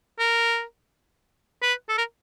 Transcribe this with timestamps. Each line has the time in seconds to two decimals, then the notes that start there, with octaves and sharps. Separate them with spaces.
0.19 A#4
1.62 B4
1.89 A4
1.98 A#4